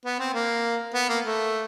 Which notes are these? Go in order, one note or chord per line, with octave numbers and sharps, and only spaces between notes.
B3
C4
A#3
B3
A#3
A3